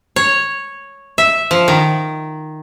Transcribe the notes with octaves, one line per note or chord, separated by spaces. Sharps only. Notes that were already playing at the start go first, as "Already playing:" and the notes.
C#5
E5
F3
D#3